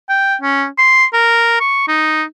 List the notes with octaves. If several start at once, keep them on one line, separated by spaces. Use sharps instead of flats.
G5
C#4
C6
A#4
C#6
D#4